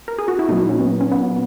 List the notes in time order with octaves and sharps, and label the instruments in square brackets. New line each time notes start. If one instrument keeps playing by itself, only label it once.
[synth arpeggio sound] A#4
G#4
F#4
E4
A#2 F#3 D#4
C#4
B3
C#4
B3